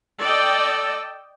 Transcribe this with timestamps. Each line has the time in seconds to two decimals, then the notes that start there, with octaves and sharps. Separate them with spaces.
0.20 A4 D5 D#5 G5